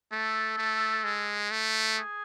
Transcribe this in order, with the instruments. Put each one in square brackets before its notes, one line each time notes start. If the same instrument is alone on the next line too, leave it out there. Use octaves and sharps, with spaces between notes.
[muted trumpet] A3 [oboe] A4
[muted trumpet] A3
G#3
A3
[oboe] G#4